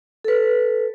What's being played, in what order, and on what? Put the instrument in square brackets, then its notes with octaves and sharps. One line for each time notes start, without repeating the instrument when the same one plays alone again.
[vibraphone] A4 B4